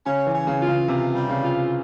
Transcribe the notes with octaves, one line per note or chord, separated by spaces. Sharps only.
C#3 C#4
E3
C#4
C#3
F4
C#3
C3 F4
G3
C#3
F4